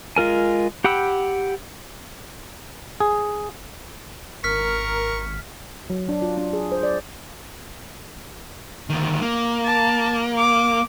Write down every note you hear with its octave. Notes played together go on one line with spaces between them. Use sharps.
G#3 F4 A#4 G#5
G4 F#5 G5 B5 E6
G#4
G#1 A#4 C#6 F6 B6
F#3
D4
F4
D4
G#4
C5
D5
D2 D#3
A#3
A5
D6